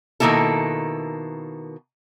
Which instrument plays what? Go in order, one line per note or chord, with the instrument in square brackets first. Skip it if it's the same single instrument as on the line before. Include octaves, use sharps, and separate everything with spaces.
[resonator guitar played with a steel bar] B2 D#3 F#3 A#3 E4 A4